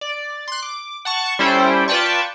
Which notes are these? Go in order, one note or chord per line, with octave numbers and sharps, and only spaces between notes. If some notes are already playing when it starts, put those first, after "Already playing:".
D5
C6 F#6
D6
F#5 A5 C#6
G3 C#4 E4 A4 C5 G5
F4 B4 D5 G5 A5 C#6